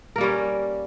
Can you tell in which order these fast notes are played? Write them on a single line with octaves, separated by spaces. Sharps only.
A#4 A#3 G3 C#4